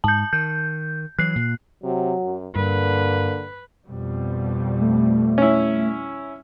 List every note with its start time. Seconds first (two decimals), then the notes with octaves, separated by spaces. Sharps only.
0.04 G#2 A5 G6
0.33 D#3 G6
1.19 E3 F#3 F#6 C7
1.36 A#2
1.84 C3 F#3
2.23 F#2
2.56 G2 D3 A#3 B4
3.85 F2 B2 G3
4.81 A3
5.38 C#4 E4